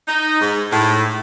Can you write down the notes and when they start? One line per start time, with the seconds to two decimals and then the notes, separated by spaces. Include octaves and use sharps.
0.08 D#4
0.41 G#2
0.72 A2